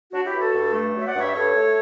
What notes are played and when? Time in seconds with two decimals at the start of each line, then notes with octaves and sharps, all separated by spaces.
0.11 F#3 D4 F#4
0.25 E4 G4
0.32 G2
0.39 F#4 A4
0.52 G2
0.73 A3
0.93 F#3
1.00 E5
1.06 D5 F#5
1.13 G2
1.20 C#5 E5
1.33 G2 A4 C#5
1.54 A3